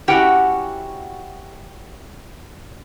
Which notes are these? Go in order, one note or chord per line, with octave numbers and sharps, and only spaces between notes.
C#4 E4 F#4 G4 F#5 G5